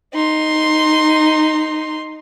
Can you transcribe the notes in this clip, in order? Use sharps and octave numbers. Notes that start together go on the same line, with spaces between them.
D#4 C6